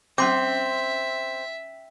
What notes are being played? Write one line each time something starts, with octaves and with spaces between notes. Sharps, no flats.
C4 C#4 E5 C6 D6